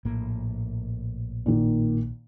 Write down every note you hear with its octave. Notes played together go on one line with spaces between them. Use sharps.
A#1 A2 A#3
A#2 D#3